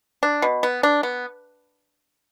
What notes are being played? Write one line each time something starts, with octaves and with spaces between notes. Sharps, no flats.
D4
B2
B3
D4
B3